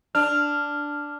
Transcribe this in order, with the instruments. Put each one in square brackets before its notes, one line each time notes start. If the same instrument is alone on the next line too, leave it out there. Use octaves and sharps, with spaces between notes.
[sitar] D4 [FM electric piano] F6